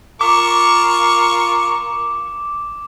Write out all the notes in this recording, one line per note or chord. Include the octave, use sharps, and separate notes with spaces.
F4 A#4 F5 C#6 D6